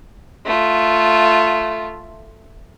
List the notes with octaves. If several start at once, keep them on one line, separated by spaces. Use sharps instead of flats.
A3 F4